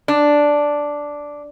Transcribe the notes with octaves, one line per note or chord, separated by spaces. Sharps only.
D4